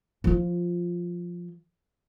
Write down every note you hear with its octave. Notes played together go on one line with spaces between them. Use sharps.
F3 F4